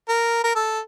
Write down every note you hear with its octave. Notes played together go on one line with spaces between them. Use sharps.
A#4
A#4
A4